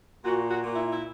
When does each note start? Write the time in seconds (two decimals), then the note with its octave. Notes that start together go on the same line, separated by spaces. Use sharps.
0.24 A#2 F#4
0.50 F#4
0.63 A#2
0.76 E4
0.92 E4